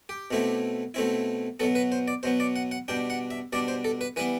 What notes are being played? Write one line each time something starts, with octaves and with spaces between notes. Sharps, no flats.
G4
B2 A3 C4 E4
B2 A3 C4 E4
B2 F#3 B3 A4
B4
C5
D5
B2 F#3 B3 C5
D5
F#5
F#5
B2 G3 D4 G5
F#5
E5
B2 G3 D4 D5
C5
A4
B4
E3 G3 B3 B4